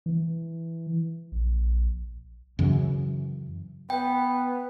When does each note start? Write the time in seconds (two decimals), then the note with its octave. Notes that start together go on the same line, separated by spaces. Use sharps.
0.06 E3
1.32 A#1
2.59 F#2 C#3 E3
3.90 B3 B4 G5